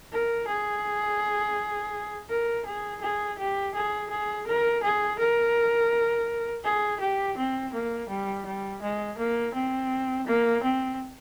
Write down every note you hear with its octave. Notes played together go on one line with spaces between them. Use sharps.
A#4
G#4
A#4
G#4
G#4
G4
G#4
G#4
A#4
G#4
A#4
G#4
G4
C4
A#3
G3
G3
G#3
A#3
C4
A#3
C4